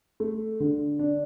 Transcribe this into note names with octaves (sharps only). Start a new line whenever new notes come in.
A3
D3
D4